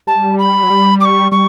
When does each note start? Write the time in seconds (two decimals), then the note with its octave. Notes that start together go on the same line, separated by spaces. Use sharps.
0.07 G3 A5
0.39 B5
0.63 F#3
0.70 G3
1.01 D6
1.05 C#6
1.32 G3 C#6